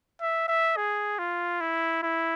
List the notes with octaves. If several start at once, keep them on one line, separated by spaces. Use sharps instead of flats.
E5
E5
G#4
F4
E4
E4